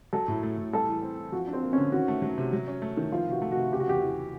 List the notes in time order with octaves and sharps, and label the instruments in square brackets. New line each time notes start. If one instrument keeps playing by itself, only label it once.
[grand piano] F#3 [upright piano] A4
[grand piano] A2
A3
A2
[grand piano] G3 [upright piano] A4
[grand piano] E3
C4
E3
[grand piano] F3 [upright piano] F#4
[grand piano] D4
[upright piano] C4
[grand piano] A#3
[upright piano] C#4
[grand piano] D3
[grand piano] D#3 [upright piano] F#4
[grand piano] A3
F#3
C3
F#3
C#4
A3
D#3
[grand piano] F3 [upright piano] F4
[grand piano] C3 [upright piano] F#4
[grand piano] A3
[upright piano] F#4
[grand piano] C3
[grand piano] C#3 [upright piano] G4
[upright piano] F#4
[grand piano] E2 [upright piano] G4
[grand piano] E3